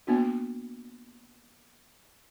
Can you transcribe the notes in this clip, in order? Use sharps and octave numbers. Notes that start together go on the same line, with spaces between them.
A#3 B3 D4 F#4